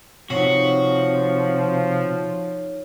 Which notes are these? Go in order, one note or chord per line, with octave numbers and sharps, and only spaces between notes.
C3 F3 D#4 F#4 C#5